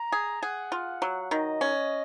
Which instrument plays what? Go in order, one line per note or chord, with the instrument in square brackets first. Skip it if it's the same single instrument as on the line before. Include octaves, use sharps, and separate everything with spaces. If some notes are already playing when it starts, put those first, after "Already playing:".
Already playing: [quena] A#5
[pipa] G#4
[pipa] G#4 [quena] F#5
[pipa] F4
F#3
[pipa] D#3 [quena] D#5
[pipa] C#4